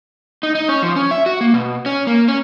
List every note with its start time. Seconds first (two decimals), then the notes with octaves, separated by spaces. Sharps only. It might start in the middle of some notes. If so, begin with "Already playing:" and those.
0.43 D#4
0.55 D#4
0.68 C#4
0.83 F3
0.96 C#4
1.11 E5
1.26 F#4
1.41 A#3
1.54 B2
1.86 C#4
2.07 A#3
2.28 C#4